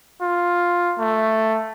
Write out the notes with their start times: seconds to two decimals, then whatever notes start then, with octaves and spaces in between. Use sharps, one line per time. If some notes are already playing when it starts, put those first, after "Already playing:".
0.22 F4
0.99 A3